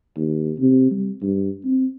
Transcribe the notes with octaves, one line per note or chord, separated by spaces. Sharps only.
D#2
C3
G3
G2
C4